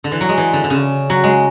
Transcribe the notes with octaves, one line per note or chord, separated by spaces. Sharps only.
D3
E3
F#3
G#3
E3
D3
D3
C#3
F#3
G#3